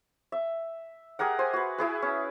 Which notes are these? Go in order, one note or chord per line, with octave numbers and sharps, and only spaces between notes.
E5
G4 G#4 A#4 F#5
C5 G#5
F#4 B4
E4 G#4 B4
C#4